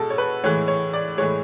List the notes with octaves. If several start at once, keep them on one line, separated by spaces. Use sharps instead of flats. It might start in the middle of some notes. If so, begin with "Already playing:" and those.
Already playing: B2 G#3 A4
C#5
B4
A2 E3 G#3 C#5
C#5
D5
A2 E3 G#3 C#5